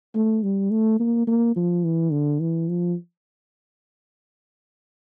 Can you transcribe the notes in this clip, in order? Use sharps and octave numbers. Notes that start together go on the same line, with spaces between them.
A3
G3
A3
A#3
A#3
F3
E3
D3
E3
F3